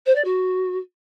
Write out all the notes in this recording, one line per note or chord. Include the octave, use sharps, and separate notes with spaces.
C5
D5
F#4